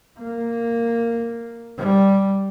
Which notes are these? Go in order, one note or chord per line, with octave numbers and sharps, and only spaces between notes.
A#3
G3